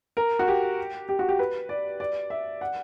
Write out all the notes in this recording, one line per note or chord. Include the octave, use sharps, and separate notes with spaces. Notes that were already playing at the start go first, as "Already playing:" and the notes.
A#4
F#4
G4
G4
F#4
G4
B4
D5
D5
E5
F#5